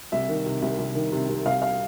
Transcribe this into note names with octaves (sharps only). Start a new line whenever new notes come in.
C2 E5
D#3
C3
C2
C2
D#3
C3
C2
C2 F5
F5